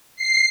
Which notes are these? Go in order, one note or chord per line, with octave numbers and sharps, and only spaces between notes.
C7